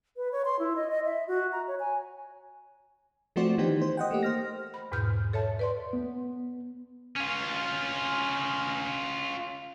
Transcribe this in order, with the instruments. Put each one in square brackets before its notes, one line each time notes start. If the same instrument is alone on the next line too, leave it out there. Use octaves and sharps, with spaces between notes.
[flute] B4
C#5
C6
E4
D#5
D#5
E5
F#4
A#5
C#5
G#5
[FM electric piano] F3 A3 C4 F#4 C5 D5
D#3 E3 B3 D#4 G4 C5
C5
D#5 F#5 G5
A3 A#3 G4
C5 F6 A#6
[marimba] B5
E2 G#2 B2 F6 G6
A4 C#5 E5 A5
B4 D5 C6
[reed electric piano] B3
[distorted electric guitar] C#4 F4